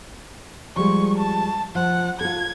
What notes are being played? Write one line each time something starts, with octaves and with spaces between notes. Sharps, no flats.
F3 G3 G#3 C#6
A5
F3 F#5
F4 A4 G#6